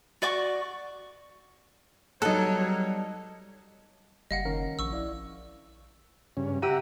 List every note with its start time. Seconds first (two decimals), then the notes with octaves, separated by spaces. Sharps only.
0.22 F#4 D5 C#6 D6
2.22 F#3 G3 B3 D#4 A4 C#5 F#6
4.31 F#1 G3 D#5 F5 F#5
4.45 D#3 C#4 A#4
4.79 A#1 C#6 E6
4.92 E4 D5 F5
6.37 G2 C#3 C#4
6.62 G4 E5 F#5 A#5 E6 D#7